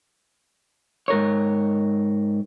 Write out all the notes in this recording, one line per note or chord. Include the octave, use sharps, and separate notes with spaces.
G#2 A#4 C#5